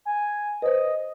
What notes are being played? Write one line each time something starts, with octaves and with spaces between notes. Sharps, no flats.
G#5
B4 C5 D#5